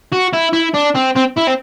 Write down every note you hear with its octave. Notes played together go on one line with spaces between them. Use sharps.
F#4
E4
E4
D4
C4
C4
E4
C4